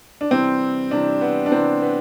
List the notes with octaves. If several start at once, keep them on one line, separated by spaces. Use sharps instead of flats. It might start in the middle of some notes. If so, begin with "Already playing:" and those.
D4
C3 E3 G3 C4
C3 E3 G3 D4
B3
D4
C3 E3 G3 C4
B3